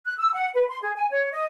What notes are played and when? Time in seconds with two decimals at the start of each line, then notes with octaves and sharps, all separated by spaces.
0.05 F#6
0.18 E6
0.33 F#5
0.55 B4
0.69 C6
0.82 G#4
0.97 G#5
1.11 C#5
1.32 D#5